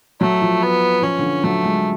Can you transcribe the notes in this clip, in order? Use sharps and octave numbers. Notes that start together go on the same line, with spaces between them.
F#3 A3
F3
B3
F3 C#4
D3
F3
F#3 A3
G#3